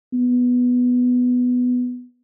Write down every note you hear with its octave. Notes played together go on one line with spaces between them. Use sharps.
B3